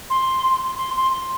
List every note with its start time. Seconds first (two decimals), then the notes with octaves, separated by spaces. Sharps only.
0.10 C6
0.78 C6
0.96 C6